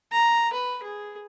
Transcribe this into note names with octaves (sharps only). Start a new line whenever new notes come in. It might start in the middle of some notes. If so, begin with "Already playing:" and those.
A#5
B4
G#4